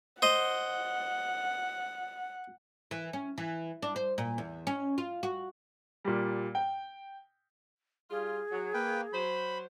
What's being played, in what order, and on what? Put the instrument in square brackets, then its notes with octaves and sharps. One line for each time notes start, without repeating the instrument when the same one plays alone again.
[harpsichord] C5 D#5 [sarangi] F#5
[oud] E3
C#4
E3
D4
C5
A#2
E2
C#4
F4
F#4
[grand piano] A#2 G3
G5
[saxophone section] G3 F4 [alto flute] G#4
[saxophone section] F#3
[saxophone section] A#3 [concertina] B4 G5
[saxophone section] F#3 C5 [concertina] B5